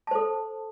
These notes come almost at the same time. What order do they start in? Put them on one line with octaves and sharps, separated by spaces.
A5 C5 A4